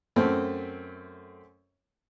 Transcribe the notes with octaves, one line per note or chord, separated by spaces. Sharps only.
F#2 A3 C4